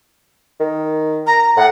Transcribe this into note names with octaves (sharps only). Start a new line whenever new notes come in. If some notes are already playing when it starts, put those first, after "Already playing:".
D#3
A#5
A2 F#5